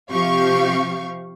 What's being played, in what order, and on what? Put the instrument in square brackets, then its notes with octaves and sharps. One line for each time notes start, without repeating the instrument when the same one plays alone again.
[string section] C3 F3 G4 F5 C#6